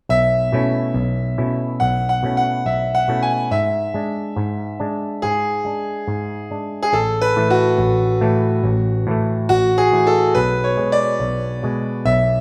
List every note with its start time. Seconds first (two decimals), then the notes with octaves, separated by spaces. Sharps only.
0.09 B1 E5
0.52 B2 A3 C#4 E4
0.94 B1
1.38 B2 A3 C#4 E4
1.80 B1 F#5
2.09 F#5
2.23 B2 A3 C#4 E4
2.37 F#5
2.66 B1 E5
2.95 F#5
3.08 B2 A3 C#4 E4
3.23 G#5
3.51 G#2 E5
3.94 G#3 D4
4.36 G#2
4.80 G#3 D4
5.22 G#2 G#4
5.65 G#3 D4
6.08 G#2
6.51 G#3 D4
6.83 G#4
6.93 A1 A4
7.21 B4
7.36 A2 E3 A3
7.50 F#4
7.78 A1
8.21 A2 E3 A3
8.64 A1
9.07 A2 E3 A3
9.49 A1 F#4
9.78 G#4
9.92 A2 E3 A3
10.07 A4
10.35 B1 B4
10.64 C#5
10.77 B2 G#3
10.92 D5
11.20 B1
11.63 B2 G#3
12.05 B1 E5